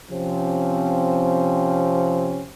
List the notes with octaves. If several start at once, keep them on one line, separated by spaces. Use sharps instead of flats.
C3 F3 C4 C#4